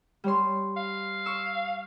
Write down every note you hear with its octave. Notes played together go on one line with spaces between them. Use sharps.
G3 C#5 C6
F5
C#6 E6